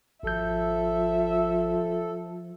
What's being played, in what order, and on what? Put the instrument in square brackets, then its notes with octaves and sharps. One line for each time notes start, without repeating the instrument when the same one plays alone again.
[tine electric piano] G#1 G6 [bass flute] F3 [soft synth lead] A4 [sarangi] E5